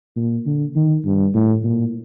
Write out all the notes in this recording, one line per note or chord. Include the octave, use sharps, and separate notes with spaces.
A#2
D3
D#3
G2
A2
A#2